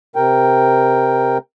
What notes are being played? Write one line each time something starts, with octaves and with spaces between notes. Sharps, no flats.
C3 A#4 G5